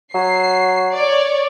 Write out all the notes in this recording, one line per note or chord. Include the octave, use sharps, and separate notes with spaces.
F#3 C7
C#5 D5